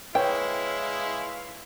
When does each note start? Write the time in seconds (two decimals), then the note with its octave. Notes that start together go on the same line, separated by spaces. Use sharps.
0.15 G#3 E4 B4 C#5 F5 G5